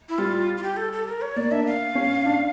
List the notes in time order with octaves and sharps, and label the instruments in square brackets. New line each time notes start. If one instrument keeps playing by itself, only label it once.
[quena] E4
[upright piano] G3 [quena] F4
[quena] F4
G4
A4
A4
A#4
C#5
[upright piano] A#3 [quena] D5
[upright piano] D4 [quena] E5
[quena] F5
[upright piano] C#4
D4